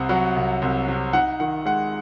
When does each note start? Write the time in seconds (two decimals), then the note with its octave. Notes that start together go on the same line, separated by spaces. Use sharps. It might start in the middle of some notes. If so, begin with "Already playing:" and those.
Already playing: C2 C3 F#5
0.09 F#3
0.36 C2
0.62 C2
0.88 C3
1.13 D#4 F#5
1.40 D#3 F#5
1.66 G#3 F#5